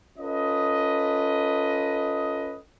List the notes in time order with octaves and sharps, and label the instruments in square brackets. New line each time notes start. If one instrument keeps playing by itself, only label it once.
[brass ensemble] C#4 F4 A4 B4 D#5